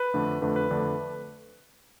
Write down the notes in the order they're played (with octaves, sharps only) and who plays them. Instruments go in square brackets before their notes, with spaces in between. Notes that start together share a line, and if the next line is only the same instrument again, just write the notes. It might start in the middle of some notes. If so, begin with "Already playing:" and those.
Already playing: [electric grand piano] B4
F2 D3 A3 D4
F2 D3 A3 D4 B4
B4
F2 D3 A3 D4